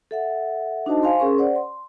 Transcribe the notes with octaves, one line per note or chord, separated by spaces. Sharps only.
A4 E5 F#5
D4 D#4 F#4 C5 D#5 A5
C5 F5 G#5 C6
C#4 G#4 A#4 C6 C#6
C5 D5 F#5
C6